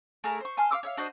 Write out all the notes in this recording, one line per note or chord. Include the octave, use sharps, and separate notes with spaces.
A3 G#4 A#4 A#5
C5 C#6
G#5 A5 C6 F6
F5 C#6 D6 E6
C#5 E5 F5
D4 F#4 C5 D#5